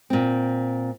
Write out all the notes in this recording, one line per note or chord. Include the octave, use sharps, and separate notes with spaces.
A#2 C4